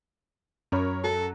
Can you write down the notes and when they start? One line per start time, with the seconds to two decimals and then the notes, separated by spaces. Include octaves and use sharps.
0.72 F#2 A#4 C#5 B5
1.04 F#3 A4